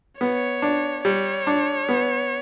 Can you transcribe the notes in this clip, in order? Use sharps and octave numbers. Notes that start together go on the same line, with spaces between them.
B3 C#5
D4
G3 C#5
D4
B3